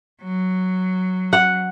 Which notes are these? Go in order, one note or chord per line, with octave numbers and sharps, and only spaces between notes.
F#3
F#5